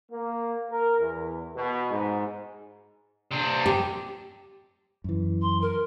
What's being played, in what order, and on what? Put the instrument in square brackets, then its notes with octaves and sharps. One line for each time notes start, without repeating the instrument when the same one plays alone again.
[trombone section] A#3
A#4
E2
B2
G#2
[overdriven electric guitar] C3 D4
[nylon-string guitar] G4
[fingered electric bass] F#2 E3
[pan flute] C6
A#4